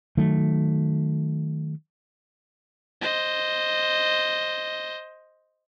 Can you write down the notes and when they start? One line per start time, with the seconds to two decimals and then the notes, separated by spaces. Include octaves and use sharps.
0.17 D#3 F#3 A3
3.01 C5 D#5